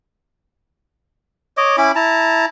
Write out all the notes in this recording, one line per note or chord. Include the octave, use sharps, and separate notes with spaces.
C#5 D#5 D6
C#4 E4 B5 D6
E4 A5 A#5